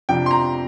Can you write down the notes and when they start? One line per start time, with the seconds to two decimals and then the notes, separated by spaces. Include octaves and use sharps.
0.09 F2 C3 F3 D4 G5
0.26 C6
0.31 A#5